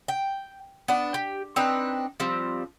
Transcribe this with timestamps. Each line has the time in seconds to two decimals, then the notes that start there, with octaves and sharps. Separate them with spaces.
0.08 G5
0.88 B3 D4
1.14 G4
1.56 C4 D4 D#4 B4
2.20 F3 G3 C4